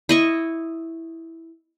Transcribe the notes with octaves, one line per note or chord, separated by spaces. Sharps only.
E4 D#5 C#6